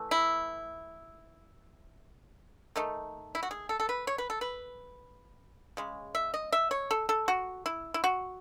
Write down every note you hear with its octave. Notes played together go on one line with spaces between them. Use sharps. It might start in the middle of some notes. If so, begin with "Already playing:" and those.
Already playing: E3 A3
E4
D#3 A3 D#4
E4
F#4
G#4
A4
A4
B4
C#5
B4
A4
B4
C#3 G#3
E5
D#5
E5
C#5
A4
A4
F#4
E4
E4
F#4